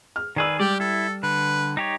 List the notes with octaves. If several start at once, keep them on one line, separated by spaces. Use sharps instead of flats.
F6
D#3 G#4 B4 D5 E6
G3 G4 D5
E4 A4
D3 B4
D#4 G4 C#5